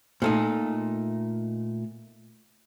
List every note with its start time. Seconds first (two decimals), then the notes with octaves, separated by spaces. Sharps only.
0.22 A#2 A3 D#4